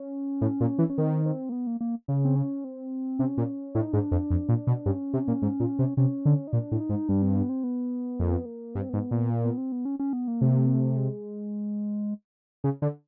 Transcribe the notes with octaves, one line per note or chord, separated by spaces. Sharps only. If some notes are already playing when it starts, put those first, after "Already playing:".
Already playing: C#4
A2
A#2
E3
C#4
D#3 C4
C4
A#3
B3
A#3
A#3
C#3
C4
C#4
C4
C3 C#4
A#2
A2 D4
D#4
G#2 D4
F2
F2
A#2
B2
G2 C#4
C3
A#2
G#2
A#2
C3
C3 C#4
D3
D#4
A#2 D4
A2
D#4
G#2
G2 D4
C4
B3
C4
B3
F2 A#3
B3
A#3
G2 B3
C4
G#2 B3
A#2
A#3
B3
C4
B3
C#4
C#4
B3
A#3
C3 A3
A#3
A3
A#3
A3
G#3
C#3
D3